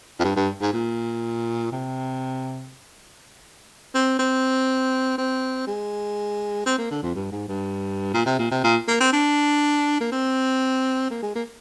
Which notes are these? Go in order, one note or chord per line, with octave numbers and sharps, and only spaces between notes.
F2
G2
G2
G#2
A#2
C3
C4
C4
C4
G#3
C4
A#3
D3
F2
G2
G#2
G2
A#2
C3
A#2
C3
A#2
A#3
C4
D4
A#3
C4
A#3
G#3
A#3